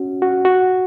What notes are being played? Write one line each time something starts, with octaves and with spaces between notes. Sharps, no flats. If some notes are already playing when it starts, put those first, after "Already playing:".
Already playing: C#4 F#4
F#4
F#4